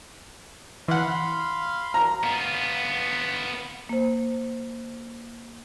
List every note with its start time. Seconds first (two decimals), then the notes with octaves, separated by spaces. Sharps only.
0.88 E3 F5 F#5 B5 C6
1.94 A#5
2.23 B3 F4
3.89 A#3 C5